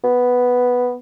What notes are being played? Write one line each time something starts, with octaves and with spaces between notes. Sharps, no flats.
B3